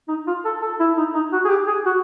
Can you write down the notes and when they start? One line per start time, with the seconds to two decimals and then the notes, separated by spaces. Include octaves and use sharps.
0.08 D#4
0.27 F4
0.45 A4
0.62 A4
0.79 E4
0.97 D#4
1.14 D#4
1.33 F#4
1.45 G#4
1.49 G4
1.67 G#4
1.86 F#4